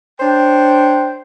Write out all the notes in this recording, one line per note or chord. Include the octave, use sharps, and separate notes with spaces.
D4 C5 C#5 G5